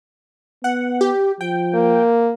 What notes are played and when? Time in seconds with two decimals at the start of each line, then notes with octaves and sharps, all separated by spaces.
0.64 B3 F#5
1.01 G4
1.41 F3 G5
1.74 A#3